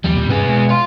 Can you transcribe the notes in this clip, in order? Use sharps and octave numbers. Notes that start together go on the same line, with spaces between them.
D#2 F3 G3
D#2 A#2
G2 C3 B3 C#4 G#4
B2 G#3
F5 C6